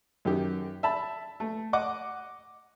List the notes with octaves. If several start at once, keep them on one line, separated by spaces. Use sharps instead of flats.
F#2 D#3 G4
E5 A5 B5
A3
D#5 F#5 D6